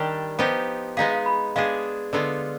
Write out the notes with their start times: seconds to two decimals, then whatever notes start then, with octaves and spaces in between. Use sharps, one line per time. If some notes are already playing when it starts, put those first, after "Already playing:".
Already playing: D#3 G3 D4 G4
0.39 F3 B3 D#4 G4 G5
0.97 G#3 B3 D#4 G#4 F5
1.11 F5
1.26 B5
1.56 G#3 B3 D4 G#4 F5
2.13 D3 G#3 B3 F4 D5